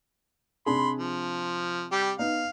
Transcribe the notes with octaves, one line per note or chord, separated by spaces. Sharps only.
C3 D4 G#4 B5 C6
F3
G3 G4
B3 D#4 F5